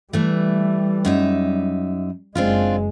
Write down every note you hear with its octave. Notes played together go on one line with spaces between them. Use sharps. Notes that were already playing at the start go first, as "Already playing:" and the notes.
E3 G3 A3
F#2 D#4 E5
F#1 G#3 C4 D4 F4